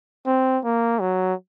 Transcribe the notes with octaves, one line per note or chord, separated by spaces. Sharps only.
C4
A#3
F#3